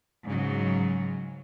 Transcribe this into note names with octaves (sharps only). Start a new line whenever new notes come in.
G#2 C#3 F#3